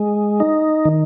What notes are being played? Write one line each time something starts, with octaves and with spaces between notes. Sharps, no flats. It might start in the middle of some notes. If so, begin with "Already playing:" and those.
Already playing: G#3
D#4
D#3